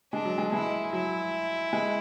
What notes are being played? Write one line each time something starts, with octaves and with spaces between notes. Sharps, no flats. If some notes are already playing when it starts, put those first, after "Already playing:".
G#3 D4
F#3
G#3
G#3 E4
F#3 E4
G#3